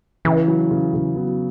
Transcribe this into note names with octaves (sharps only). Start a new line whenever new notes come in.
C#3 E3
F#3
C#3
C#3
F#3 B3